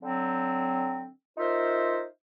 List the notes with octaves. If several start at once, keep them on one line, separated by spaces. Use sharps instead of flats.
D3 F#3 C4
D#4 F4 A#4 C5 E5